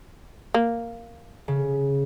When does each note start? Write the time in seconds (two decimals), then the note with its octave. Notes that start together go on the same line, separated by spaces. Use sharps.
0.54 A#3
1.48 C#3